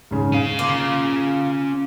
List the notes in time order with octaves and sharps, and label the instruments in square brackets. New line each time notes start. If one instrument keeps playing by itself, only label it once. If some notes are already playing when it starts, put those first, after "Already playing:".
[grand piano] G#2 C#3
[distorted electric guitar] C#4 F5 [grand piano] D#7
[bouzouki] A#3 F4